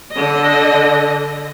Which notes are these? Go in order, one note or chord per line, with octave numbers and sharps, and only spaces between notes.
D3 D#5